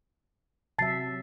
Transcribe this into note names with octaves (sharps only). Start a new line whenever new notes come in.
C3 F#3 E5 A5 A6 C7